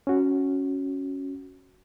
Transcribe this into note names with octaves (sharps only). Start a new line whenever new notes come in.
C#4 F#4